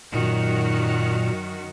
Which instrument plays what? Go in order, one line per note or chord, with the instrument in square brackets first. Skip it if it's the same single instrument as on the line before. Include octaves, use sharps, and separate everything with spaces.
[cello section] F#2 D#3 F#4 [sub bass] A#2